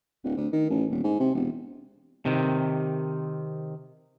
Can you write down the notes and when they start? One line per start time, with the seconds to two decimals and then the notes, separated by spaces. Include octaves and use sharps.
0.24 D1
0.37 D2
0.53 D#3
0.70 A1
0.90 D#1
1.04 G#2
1.20 C3
1.34 E1
2.25 C3 D#3